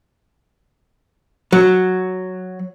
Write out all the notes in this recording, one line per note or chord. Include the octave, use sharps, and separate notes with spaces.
F#3